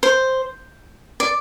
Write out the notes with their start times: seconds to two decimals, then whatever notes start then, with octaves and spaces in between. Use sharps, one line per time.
0.03 C5
1.20 D5